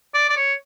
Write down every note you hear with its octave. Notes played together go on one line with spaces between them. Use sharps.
D5
D5
C#5